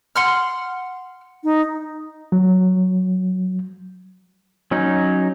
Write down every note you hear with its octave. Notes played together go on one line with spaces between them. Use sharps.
F#5 C6 F6
D#4
F#3
F#3 C#4 D#4